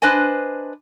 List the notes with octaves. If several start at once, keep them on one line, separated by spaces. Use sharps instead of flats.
D4 B4 C5 D#5 G#5